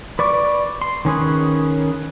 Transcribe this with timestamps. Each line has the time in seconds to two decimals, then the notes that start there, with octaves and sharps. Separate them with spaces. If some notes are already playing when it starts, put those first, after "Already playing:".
0.19 B4 D5 C#6 D6
0.82 C6
1.05 D#3 C#4 G#4 B4